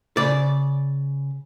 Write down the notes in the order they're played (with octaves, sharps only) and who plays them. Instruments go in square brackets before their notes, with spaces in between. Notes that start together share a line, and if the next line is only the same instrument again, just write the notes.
[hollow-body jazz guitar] C#3 D5